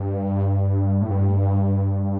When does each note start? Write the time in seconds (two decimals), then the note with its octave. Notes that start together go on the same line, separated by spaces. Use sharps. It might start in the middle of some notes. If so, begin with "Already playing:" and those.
Already playing: G2
1.01 A2
1.11 G2